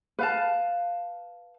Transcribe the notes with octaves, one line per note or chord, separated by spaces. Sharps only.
B4 F5 A5